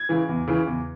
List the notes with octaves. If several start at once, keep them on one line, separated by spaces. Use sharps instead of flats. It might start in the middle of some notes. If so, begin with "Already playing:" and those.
Already playing: G#6
C#3 E3
E2
C#3 E3
E2